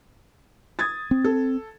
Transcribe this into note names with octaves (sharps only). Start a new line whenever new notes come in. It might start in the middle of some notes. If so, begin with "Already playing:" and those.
D#6 G#6 A6
C4
A4